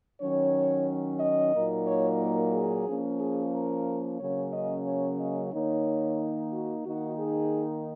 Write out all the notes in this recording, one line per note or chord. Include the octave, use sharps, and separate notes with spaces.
D#3 F#3 C#4 C#5
D#5
A#2 F#3 A#3 D#4
C#5
A#4
G#4
F3 A#3 C#4
G#4
A#4
C#3 F#3 A#3 C#4 C#5
D#5
C#5
D#5
D#3 A#3 D#4 C#5
F#4
D#3 A#3 D#4 F#4
G#4